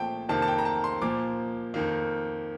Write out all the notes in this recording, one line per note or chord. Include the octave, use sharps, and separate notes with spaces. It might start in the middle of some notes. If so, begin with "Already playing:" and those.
Already playing: A#2 F3 A3 C4 G5 A5
F2 C3 D#3 A#3 A5
A5
G5
A#5
A5
C6
A#2 F3 A#3 D6
F2 D#3 A#3